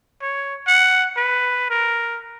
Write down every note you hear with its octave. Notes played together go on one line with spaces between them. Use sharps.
C#5
F#5
B4
A#4